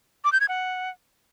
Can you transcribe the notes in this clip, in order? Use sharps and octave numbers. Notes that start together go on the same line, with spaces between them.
D6
G6
G#6
F#5